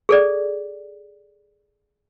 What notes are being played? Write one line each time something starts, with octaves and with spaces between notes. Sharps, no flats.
G#4 A4 D5